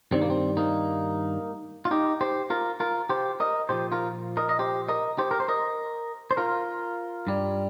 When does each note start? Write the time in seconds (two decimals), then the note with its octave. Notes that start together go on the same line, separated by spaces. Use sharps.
0.11 G2 D#3 G3 C4
0.22 A#3
0.30 C4
0.57 A#3 D#4
1.85 F4
1.91 D#4 G4
2.21 G4 C5
2.50 F4 A#4
2.80 F4 A#4
3.09 G4 C5
3.40 A#4 D#5
3.69 A#2 F3 G4 C5
3.92 F4 A#4
4.37 A#4 D#5
4.49 D#5
4.59 G4 C5
4.89 A#4 D#5
5.18 G4 C5
5.31 A#4
5.40 C5
5.48 A#4 D#5
6.31 C5
6.37 F4 A#4
7.27 G2 G3